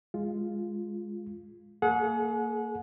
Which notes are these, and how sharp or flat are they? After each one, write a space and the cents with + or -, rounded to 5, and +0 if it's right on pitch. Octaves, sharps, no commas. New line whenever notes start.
G#3 +0 F4 +0
A#3 -20 G#4 +35 F#5 -20